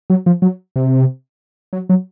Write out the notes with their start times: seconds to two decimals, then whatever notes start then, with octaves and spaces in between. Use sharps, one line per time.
0.10 F#3
0.26 F3
0.42 F#3
0.76 C3
1.73 F#3
1.89 F#3